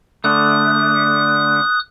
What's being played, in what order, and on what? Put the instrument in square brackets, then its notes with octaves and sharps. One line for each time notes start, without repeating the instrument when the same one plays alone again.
[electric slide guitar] D3 A3 [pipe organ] D#6 F#6